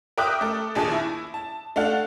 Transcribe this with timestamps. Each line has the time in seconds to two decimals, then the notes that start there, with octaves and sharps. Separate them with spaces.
0.17 A#4 E5 G5 D6 D#6 F#6
0.41 A3 A4
0.75 A#1 D#2 G#4 A5
0.92 E4
1.34 A5
1.76 A3 D4 F5 F#5